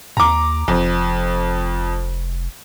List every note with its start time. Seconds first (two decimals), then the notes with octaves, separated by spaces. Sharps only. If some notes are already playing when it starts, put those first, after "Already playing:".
0.17 D#2 A#5 D6
0.68 F1 F2